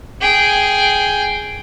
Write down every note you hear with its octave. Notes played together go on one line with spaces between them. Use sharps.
G#4 G5